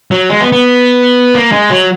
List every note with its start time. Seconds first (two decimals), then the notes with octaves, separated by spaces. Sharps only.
0.11 F#3
0.29 G#3
0.41 B3
0.52 B3
1.35 A#3
1.52 G#3
1.70 F#3